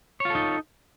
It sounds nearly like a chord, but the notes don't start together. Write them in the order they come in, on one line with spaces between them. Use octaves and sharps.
C#5 F4 A4 D#4